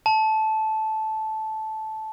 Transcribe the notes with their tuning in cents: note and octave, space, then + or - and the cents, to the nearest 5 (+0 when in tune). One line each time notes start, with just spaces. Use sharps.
A5 -10